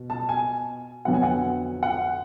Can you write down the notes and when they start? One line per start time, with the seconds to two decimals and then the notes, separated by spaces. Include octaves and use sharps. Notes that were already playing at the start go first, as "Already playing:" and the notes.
Already playing: B2
0.10 A5
0.29 G#5
1.05 F2 D3 F#3 B3 F#5
1.14 G#5
1.23 F#5
1.83 F#5